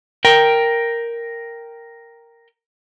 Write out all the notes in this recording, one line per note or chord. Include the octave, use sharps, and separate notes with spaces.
A#4 G5